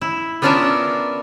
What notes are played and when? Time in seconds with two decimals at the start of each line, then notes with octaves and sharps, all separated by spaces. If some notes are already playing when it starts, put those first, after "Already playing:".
0.01 E4
0.42 B3 C#4 D4 F4 A#4 E5